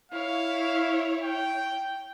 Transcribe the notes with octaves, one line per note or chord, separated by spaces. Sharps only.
E4 C#5 F5
G5